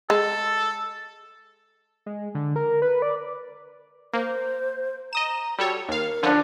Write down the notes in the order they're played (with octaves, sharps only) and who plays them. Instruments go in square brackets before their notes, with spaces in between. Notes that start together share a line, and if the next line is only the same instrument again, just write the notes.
[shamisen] G#3 [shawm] A4
[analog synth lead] G#3
D3
A#4
B4
D5
[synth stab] A#3 [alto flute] C5
[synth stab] D#5 D#6 E7 [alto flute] A#5
[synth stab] G3 A4 C#5 [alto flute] F#4
[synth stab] D#2 F5 [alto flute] A#4
[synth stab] D3 F3 C#4 [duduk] D4